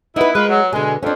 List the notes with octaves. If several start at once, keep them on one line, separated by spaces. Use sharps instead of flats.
B3 D#4 E4 B4
G#3 F4 A#4 B4
F#3
B2 D3 G#3
F2 C#4 D4